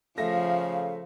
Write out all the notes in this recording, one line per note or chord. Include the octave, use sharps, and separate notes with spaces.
C#3 F3 A3 E5 F5 A#6